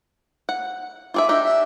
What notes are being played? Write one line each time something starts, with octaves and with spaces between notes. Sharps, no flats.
F#5
F4 G#4 E5 D6
D4 D#4 G4 E5
E5